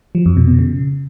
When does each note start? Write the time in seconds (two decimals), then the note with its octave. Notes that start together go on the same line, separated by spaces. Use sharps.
0.15 F3
0.26 F2
0.37 B2
0.48 B2
0.59 C#3